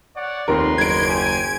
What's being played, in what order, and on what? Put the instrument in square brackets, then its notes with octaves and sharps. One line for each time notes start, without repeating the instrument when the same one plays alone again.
[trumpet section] C#5 D5 F#5
[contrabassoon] F1 [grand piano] D#2 A#4 [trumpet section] D#4 B4 C6
[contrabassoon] F#1 [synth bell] G#6 D7
[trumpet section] G4 G#5